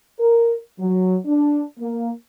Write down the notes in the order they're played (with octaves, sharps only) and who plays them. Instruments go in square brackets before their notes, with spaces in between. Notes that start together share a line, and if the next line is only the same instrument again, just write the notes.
[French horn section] A#4
F#3
D4
A#3